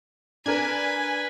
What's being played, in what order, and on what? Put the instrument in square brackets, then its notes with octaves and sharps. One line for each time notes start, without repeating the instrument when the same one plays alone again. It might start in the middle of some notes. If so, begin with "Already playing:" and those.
[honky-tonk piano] D4 A#4 [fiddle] B4 [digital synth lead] G#5